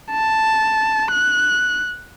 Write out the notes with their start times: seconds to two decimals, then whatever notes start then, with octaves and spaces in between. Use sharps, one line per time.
0.12 A5
1.11 F#6